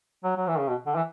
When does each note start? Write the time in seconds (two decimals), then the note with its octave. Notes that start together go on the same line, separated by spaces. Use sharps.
0.24 F#3
0.36 F#3
0.47 E3
0.59 C#3
0.68 B2
0.86 D3
0.95 E3